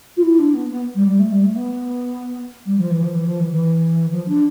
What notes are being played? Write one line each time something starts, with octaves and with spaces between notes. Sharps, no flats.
F4
E4
D4
B3
B3
G3
G3
A3
G3
A3
B3
G3
F3
E3
F3
E3
F3
E3
E3
F3
D4